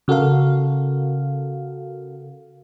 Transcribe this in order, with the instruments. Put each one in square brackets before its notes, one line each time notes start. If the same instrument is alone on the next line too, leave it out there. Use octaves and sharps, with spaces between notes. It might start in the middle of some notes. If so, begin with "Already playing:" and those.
[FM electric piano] C#3 F#4 A4 A#4 F5